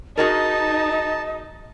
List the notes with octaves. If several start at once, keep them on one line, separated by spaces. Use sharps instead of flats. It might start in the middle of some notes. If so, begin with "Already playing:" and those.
D#4 F#4 G#4 A#4 D#5 A5